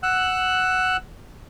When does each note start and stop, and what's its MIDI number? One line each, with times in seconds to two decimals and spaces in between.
0.03 0.97 78
0.03 0.97 88
0.03 0.97 90